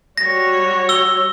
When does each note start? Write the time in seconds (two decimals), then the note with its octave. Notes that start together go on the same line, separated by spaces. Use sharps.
0.18 G3 F#4 C#5 A#6
0.89 E6 G7